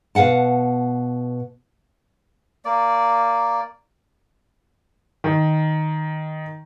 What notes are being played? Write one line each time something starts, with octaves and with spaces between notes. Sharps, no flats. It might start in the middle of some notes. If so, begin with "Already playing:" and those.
B2 F5 F#5 A5
A#3 D5
D#3